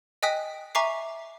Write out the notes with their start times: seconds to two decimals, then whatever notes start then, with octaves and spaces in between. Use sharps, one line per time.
0.23 D#5 G5 G#5 D#6 F#6 B6
0.75 E5 G#5 A#5 C#6 D6 C7